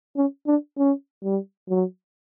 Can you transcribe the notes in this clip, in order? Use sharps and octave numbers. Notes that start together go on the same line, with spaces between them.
C#4
D4
C#4
G3
F#3